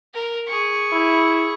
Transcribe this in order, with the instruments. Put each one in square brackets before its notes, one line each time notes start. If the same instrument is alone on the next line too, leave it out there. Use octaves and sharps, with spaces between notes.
[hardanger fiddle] A#4
G#4 C#6
[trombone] E4